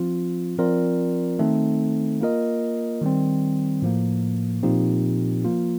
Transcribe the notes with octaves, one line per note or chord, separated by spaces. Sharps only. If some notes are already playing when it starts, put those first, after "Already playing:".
Already playing: F3 C4 F4
F3 C4 F4 A#4 D5
D#3 A3 C4 D#4 A4
A#3 F4 A#4 D#5
D#3 G3 C4
A2 F3 A#3
A#2 F3 C4 D#4 G4
F3 A#3 F4